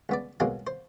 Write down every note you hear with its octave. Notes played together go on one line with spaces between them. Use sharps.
C#2 B3 D5
C2 B2 F#3 G#3 A#3 G#5
C5